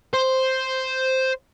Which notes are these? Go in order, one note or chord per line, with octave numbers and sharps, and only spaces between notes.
C5